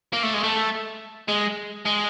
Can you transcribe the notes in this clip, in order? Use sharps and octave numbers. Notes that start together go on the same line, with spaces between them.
A#3
A3
G#3
A3
G#3
G#3